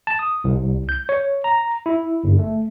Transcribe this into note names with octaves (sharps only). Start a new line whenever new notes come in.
A5
D#6
C2
G6
C#5
A#5
E4
G1
A3